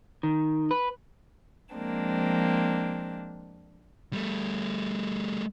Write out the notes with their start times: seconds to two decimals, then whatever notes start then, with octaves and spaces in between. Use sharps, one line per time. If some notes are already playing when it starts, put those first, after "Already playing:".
0.23 D#3
0.71 B4
1.75 F3 G#3 A#3 C4 D4
4.13 G3 A3